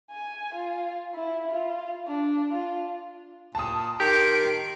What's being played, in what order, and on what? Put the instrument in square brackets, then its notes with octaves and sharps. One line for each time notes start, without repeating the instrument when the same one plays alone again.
[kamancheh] G#5
F4
E4
F4
D4
F4
[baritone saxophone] A#2 [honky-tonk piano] A5 D#6
[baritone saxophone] D#3 [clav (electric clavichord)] G4 [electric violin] C6 D7